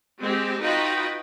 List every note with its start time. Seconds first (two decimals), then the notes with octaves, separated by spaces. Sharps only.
0.21 G#3 C4 G4
0.61 D#4 F4 F#4 B4 D#5 G5